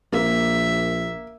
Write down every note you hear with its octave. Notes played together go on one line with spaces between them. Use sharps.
A#1 A#3 E5